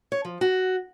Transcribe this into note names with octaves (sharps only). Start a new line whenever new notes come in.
C#5
F3
F#4